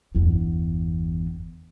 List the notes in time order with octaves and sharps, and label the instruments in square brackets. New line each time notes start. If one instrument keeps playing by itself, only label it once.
[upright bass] G1 E2